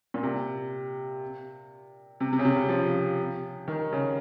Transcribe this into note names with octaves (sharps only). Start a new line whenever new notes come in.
A#2
C3
C3
C3
C#3
C3
C#3
F3
D#3
C#3